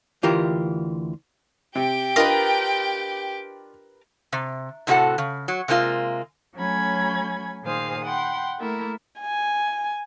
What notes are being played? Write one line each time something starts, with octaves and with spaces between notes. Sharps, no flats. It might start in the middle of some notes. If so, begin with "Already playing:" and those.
D2 E3 F4 G4 A#4
C3 G4 G5
D4 F4 A#4 B4 D#5
C3
A2 C3 D#4 F#4 A4 F#5
C#3
F#3
C3 G#3 A#3 F4
F#3 A3 C#4 G#5 B5 G#6
A#2 D#3 G#4 C5 F5 D#6
F#5 G5 B5 C6
A3 A#3 E4 A#4
G#5